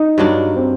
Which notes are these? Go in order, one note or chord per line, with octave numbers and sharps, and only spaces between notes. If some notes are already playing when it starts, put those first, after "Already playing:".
Already playing: D#4
G2 F#3 A#3 D4
C4